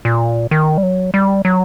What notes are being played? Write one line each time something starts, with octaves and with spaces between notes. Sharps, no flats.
A#2
D#3
G3
F#3
G3
F#3